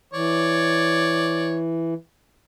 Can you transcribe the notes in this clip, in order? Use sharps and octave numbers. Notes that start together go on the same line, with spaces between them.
E3 C#5 D5